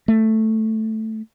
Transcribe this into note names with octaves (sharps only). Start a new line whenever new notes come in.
A3